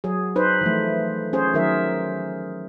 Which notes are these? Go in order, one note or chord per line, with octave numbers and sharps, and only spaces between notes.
F#3 G#4
D#4 B4 C5
E3 F3 A3
C#4 G#4 C5
D#3 F#3 G#4 A#4 E5